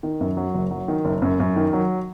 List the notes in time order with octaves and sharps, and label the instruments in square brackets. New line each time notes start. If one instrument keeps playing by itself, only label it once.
[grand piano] D#3
F#2
F#3
F#1
F#3
D#3
F#1
F#2
F#2
D#3
F#3